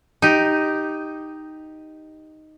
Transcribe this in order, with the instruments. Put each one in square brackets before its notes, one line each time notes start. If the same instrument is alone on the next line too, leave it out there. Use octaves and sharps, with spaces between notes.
[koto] D#4 G4